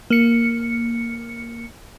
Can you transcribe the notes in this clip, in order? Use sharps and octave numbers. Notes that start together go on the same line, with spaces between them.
A#3 C#7